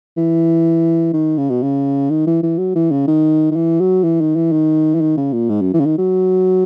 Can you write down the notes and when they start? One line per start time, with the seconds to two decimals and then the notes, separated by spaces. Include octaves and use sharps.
0.17 E3
1.13 D#3
1.38 C#3
1.50 B2
1.62 C#3
2.10 D#3
2.27 E3
2.43 E3
2.58 F#3
2.75 E3
2.91 C#3
3.07 D#3
3.51 D#3
3.56 E3
3.80 F#3
4.04 E3
4.21 D#3
4.36 E3
4.52 D#3
4.95 E3
5.01 D#3
5.17 C#3
5.33 A#2
5.49 G#2
5.61 F#2
5.74 E3
5.80 C#3
5.86 D#3
5.98 F#3